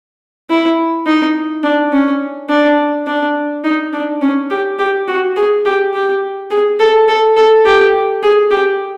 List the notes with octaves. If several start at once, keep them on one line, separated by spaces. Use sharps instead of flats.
E4
D#4
D4
C#4
D4
D4
D#4
D4
C#4
G4
G4
F#4
G#4
G4
G4
G#4
A4
A4
A4
G4
G#4
G4